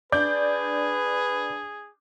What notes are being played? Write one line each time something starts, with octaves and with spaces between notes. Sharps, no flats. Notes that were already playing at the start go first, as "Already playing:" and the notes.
D4 G#4 B4 D5 G6